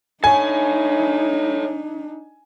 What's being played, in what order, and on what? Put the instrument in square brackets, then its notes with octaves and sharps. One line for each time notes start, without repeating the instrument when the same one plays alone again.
[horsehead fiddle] D4 D#4 [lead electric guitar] A4 C#5 [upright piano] G#5